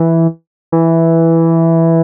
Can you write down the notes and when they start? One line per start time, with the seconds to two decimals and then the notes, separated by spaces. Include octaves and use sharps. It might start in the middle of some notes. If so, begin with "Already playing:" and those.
Already playing: E3
0.72 E3